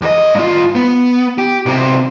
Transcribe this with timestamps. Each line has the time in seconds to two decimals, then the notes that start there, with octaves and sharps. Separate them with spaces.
0.02 E2 D#5
0.35 G2 F4
0.75 B3
1.38 G4
1.66 B1 C3